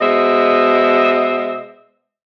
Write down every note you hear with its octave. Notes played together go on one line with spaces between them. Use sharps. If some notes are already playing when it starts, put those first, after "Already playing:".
B2 G#3 C5 D#5 E5